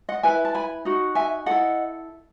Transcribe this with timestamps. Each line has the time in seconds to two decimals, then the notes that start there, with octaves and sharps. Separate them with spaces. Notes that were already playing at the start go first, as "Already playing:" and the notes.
0.09 D#5 F#5
0.23 E4 B4 E5 G#5
0.45 A5
0.55 G#5 B5
0.85 D#4 F#4
1.15 E5 G#5
1.46 E4 A4 D#5 F#5